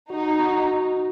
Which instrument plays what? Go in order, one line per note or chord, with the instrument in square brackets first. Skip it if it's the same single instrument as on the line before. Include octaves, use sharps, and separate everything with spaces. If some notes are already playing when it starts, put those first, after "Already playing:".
[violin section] D#4 [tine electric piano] F#4
[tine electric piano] F#4